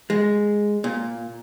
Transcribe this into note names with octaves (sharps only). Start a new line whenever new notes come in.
G#3
A#2